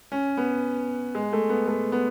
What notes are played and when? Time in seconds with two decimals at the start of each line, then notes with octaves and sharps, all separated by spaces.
0.12 C#4
0.37 B3
1.15 G#3
1.33 A3
1.49 B3
1.67 A3
1.92 B3